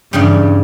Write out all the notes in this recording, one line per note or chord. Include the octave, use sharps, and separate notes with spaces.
E2 G2 C#3 G3